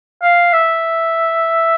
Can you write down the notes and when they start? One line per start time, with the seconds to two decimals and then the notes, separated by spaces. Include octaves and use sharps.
0.22 F5
0.53 E5